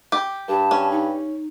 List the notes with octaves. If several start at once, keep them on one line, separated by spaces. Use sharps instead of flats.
G4
G2 A5
C#4
D#4